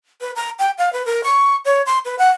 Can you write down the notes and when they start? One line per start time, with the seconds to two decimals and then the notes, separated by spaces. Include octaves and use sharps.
0.21 B4
0.36 A#5
0.59 G5
0.78 F5
0.93 B4
1.06 A#4
1.24 C#6
1.65 C#5
1.86 C6
2.05 B4
2.19 F#5